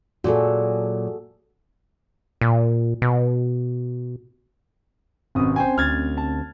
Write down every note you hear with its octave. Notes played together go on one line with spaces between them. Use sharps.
A#2 F#3 F#4 G#4 A4
A#2
B2
G#1 B2 C4 C#4 D#6
C5 G5 G#5
D2 F6 G#6 A6
A5